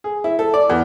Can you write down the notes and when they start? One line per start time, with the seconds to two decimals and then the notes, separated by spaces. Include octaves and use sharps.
0.04 G#4
0.24 E4
0.39 A4
0.54 D5
0.70 E2